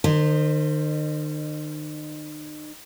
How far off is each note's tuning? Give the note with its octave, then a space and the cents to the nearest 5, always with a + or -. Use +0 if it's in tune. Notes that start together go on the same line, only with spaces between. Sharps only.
D#3 -40 C5 +0 D#5 -35